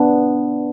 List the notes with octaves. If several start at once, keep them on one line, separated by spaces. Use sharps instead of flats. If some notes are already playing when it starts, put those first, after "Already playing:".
Already playing: B3 D4